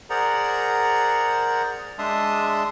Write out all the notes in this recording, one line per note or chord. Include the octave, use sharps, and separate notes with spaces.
G#4 A#4 C5 D5 F#5 A#5
G#3 D4 E5 A5 C6 D#6